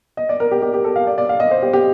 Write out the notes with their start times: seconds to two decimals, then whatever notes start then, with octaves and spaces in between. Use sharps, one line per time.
0.17 D#5
0.29 D5
0.40 A#4
0.51 G4
0.62 G4
0.74 G4
0.84 A4
0.96 F5
1.07 D5
1.18 D5
1.29 F5
1.40 D#5
1.51 C5
1.62 G4
1.73 G4